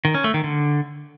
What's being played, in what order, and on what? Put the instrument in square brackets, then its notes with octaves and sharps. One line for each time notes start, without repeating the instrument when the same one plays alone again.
[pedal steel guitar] D#3
C#4
A3
D#3
D3